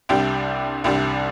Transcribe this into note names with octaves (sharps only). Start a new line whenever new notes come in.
C2 C3 G3 D4 G5
C2 C3 G3 D4